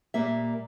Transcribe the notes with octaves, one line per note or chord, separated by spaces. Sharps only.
A#2 G3 A#3 E5